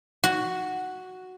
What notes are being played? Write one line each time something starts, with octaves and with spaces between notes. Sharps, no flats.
F#4